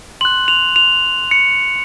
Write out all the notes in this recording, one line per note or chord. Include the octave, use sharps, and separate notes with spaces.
C6 F#6 F#7
F7
F7
C#7